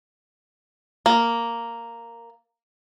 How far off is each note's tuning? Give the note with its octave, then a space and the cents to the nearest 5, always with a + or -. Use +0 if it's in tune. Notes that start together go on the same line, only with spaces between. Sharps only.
A#3 -5